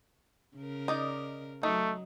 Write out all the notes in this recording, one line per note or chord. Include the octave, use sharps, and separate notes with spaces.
C#3 A#4
D#4 D5 D#5
F#3 A3 D#4